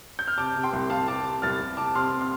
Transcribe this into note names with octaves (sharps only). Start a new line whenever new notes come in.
G6
F6
C3 A5 D6
C3
G5 C6
C2
C2 F5 A5
C3 A5 D6
C3
C2 F6 A6
C2
C3 A5 D6
C3 C6 F6
C6 F6